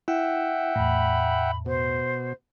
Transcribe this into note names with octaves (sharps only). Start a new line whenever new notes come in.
E4 E5 F#5 G5
E2 A2 B5
B2 C5